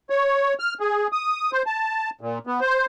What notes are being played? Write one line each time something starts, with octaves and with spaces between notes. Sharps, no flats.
C#5
F6
G#4
D#6
C5
A5
A#2
B3
C5